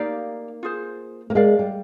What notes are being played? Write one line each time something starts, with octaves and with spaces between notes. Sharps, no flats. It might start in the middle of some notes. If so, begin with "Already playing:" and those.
Already playing: A#3 D#4 G4 D5 F5
F4 G#4 C5
A#3
G#3 A#4 D5 F5
G3